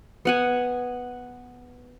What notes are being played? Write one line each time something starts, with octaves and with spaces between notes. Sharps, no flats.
B3 F#5 G#5